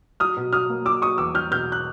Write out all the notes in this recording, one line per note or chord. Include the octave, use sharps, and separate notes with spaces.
F#3 D#6 F6
B2
F#3 D#6 F6
A#3
F#3 D6 E6
F#3 C#6 D#6
E2 D6 E6
F#3 F6 G6
B2 F6 G6
F#6